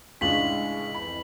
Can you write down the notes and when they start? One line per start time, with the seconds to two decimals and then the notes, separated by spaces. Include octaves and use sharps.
0.21 C#2 A2 G#3 D4 F4 B6 F#7
0.94 F2 E3 B5